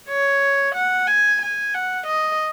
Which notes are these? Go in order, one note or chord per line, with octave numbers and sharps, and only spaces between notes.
C#5
F#5
G#5
G#5
F#5
D#5